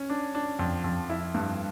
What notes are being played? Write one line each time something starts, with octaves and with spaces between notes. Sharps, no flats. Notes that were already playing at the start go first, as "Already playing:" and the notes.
Already playing: C#4
D4
D4
F2
F2
E4
G2